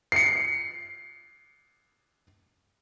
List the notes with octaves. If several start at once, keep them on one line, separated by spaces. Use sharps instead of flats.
C7 C#7